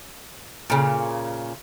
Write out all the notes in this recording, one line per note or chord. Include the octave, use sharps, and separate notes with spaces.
A#2 C#3